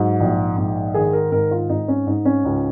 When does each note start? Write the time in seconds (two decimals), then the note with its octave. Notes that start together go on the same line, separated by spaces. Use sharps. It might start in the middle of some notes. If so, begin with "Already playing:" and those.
Already playing: G#2 F#3
0.20 A#1
0.57 G#2
0.94 D#3 G#4
1.13 A#4
1.32 G#2 A#4
1.51 F4
1.69 G#2 D#4
1.88 C#4
2.07 G#2 D#4
2.25 C#4
2.45 C#2